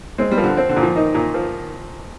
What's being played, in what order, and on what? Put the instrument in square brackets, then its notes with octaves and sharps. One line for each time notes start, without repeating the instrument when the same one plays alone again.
[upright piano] G#3 [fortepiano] C4
[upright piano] G3
[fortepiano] F3
[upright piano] D3
[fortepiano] C4
[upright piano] D3
[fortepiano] A#2
[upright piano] F3
[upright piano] D#3 [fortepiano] D#4
[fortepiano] A#2
F3